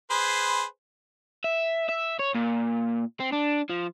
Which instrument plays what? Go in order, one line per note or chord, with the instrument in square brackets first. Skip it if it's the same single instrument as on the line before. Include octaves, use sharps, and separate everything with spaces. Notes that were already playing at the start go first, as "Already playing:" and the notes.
[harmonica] G#4 B4 C5
[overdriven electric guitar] E5
E5
C#5
A#2
C4
D4
F3